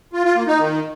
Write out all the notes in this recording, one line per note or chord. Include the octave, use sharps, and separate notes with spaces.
F4
F4
A#3
D#4
D#3